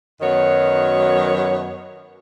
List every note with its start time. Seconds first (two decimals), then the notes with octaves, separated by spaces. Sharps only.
0.21 F#2 D#3 F#3 B3 C#5